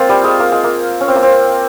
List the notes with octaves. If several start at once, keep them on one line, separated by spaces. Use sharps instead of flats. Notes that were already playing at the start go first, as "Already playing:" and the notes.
Already playing: A#3 C4 F4
G3
G#3
A#3
G#3
A#3
C#4
C4
A#3
C4